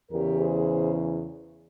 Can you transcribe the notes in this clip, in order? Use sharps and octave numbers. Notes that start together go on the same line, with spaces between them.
E2 C#3 E3 G4 A#4
G#4 C5